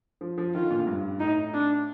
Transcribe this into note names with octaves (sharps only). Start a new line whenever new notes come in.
F3
F3
D#3 F4
D3
A#2
A2
G2
A2 D#4
D4